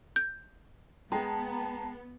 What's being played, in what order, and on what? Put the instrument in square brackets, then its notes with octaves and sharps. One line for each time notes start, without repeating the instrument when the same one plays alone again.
[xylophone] G6
[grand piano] G#3 [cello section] B3 [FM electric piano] G5 A5 A#5